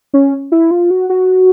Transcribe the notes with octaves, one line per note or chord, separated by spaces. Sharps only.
C#4
E4
F4
F#4
F#4